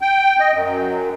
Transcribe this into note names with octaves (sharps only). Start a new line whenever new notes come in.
G5
D#5
F#2